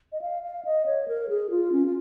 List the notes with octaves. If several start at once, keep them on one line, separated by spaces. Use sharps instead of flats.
D#5
F5
F5
D#5
C#5
A#4
G#4
F4
C#4
F4